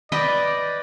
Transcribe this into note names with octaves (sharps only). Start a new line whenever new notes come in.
B4 D5 D#5 G5